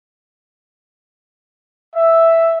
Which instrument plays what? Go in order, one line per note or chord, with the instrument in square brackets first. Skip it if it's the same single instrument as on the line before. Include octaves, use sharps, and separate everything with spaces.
[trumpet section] E5